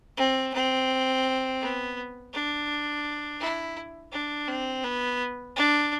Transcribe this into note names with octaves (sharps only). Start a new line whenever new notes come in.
C4
C4
B3
D4
E4
D4
C4
B3
D4